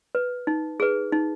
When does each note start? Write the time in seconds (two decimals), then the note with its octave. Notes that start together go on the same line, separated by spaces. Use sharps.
0.15 B4
0.47 D#4
0.80 G#4 B4
1.12 D#4